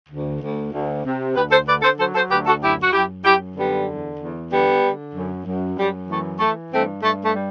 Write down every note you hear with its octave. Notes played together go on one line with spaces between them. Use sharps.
D2
D2
D2
C3
D2 G4 B4
A4 C5
D3 B4 D5
A4 C5
F#3 A4 C5
A4 C5
D2 G4 B4
F#4 A4
F#2 E4 G4
F#4
F#2 E4 G4
F#2 E4 G4
D3 G3 B3
E2
E2
D3 G3 B3
D3
F#2
F#2
F#2 G3
E3 A3
E3 A3
G2 A3 C4
G2 A3
A3
G3